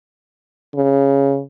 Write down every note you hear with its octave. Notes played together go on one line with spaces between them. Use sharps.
C#3